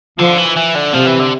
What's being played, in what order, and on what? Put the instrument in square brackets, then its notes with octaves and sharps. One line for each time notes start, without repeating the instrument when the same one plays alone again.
[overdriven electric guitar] D3 [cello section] F3
[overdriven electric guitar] E3
E3
D3
[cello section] C3 [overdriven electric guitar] F3
[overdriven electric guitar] E3
D3